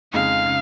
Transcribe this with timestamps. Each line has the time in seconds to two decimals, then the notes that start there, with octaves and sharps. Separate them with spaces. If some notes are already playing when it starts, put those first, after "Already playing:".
0.13 F2 C#3 G#3 D#4 F5
0.46 C#3